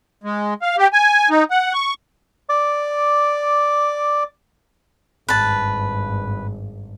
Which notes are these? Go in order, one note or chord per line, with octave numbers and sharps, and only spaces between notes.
G#3
F5
G4
G#5
D#4
F#5
C#6
D5 D6
G#1 G2 B4 A5